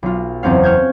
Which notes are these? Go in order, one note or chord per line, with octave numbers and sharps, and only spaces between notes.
B1 F4
F#1 E2 C4 C#4 F5
C#6 F6 G6 G#6